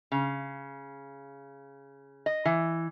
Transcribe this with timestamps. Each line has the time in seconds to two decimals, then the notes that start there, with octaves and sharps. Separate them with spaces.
0.12 C#3
2.26 D#5
2.45 E3